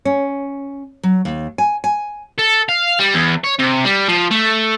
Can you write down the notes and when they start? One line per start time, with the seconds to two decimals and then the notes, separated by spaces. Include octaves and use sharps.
0.05 C#4
1.03 F#3
1.25 D#2
1.58 G#5
1.84 G#5
2.38 A4
2.69 F5
2.99 G3
3.14 E2
3.44 C#5
3.59 C3
3.84 G3
4.08 F3
4.31 A3